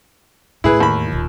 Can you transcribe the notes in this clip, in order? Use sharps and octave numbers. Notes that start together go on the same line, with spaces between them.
E2 A2 E4 G#4 B4
D#2 B5
D#1 F4